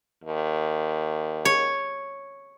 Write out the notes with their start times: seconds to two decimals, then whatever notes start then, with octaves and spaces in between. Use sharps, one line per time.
0.24 D#2
1.45 C#5